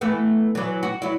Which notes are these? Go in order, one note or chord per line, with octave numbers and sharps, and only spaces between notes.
E3 A3 B3
E3 F#3
F#4
F#3 E4